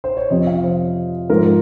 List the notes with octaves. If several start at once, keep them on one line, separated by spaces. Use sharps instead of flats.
C5
C#5
F2 C3 F3 D#5
F5
C5
G#2 F3 A#4